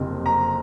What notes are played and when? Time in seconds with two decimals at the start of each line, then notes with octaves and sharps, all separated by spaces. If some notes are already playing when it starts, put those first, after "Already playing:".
Already playing: F#1 F2 C3
0.26 A#5